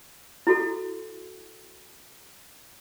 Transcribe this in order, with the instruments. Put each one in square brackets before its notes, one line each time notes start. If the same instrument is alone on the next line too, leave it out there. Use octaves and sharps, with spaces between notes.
[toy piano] E4 F#4 A4